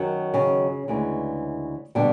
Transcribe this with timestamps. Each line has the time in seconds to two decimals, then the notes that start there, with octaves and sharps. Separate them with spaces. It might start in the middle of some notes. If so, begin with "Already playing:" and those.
Already playing: F#2 D#3 F#3
0.34 C#3 C#4
0.88 D2 C#3 E3 G#3
1.95 B2 D3 G3 D4